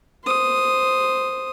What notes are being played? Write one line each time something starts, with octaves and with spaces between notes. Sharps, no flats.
C5 D#6